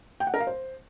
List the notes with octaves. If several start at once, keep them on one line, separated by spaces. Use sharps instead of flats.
G5
F#5
A#4
F5
C5